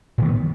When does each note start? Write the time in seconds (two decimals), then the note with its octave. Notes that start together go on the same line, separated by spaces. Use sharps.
0.18 A2
0.21 D#3
0.25 B3
0.28 F3